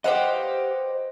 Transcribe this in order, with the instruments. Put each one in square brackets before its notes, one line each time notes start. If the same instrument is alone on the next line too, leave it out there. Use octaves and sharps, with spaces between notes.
[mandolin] G4 F5 F#5 [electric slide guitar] B4 C5 D#5